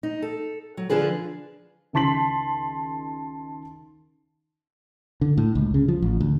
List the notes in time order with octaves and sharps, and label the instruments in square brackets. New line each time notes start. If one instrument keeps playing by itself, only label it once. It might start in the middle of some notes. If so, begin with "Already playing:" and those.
[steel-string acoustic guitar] D#4
A4
F#3
D3 F3 D4 G#4 B4
[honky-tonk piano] C#2 D#3 A5 C6 B6 F#7
[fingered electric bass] D3
A2
C#2
C#3
F3
A1
D2